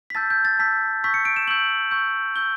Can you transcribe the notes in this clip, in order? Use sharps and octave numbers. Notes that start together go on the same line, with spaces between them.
B6
A5 E6 G6 A6
G6
A6
A5 E6 G6 B6
C#6 E6 G6 B6
C#7
D7
E7
C#6 E6 G6 F#7
C#6 E6 G6
C#6 E6 G6 G7